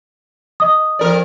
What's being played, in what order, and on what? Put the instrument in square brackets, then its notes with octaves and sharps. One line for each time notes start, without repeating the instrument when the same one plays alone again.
[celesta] D#5 D#6
[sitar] F2 A#4 D5